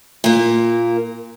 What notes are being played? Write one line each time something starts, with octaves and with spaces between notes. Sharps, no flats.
A#2 A#3